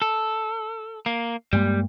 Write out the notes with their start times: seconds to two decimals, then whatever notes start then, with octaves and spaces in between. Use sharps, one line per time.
0.02 A4
1.06 A#3
1.53 G2 G3 G#3 A#3